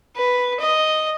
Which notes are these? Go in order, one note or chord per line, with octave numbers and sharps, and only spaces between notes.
B4
D#5